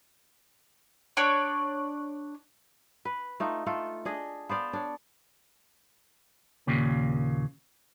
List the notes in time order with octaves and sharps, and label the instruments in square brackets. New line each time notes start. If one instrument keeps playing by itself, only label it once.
[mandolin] D4 C#5 D5
[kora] B4
A3 D#4 F4
A3 F4 A4
D4 G#4 D#5
B3 C5 D5 F5
D4 C#5
[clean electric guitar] D#2 A#2 C#3